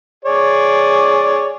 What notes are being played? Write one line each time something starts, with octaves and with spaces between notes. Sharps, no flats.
G#4 C#5 D5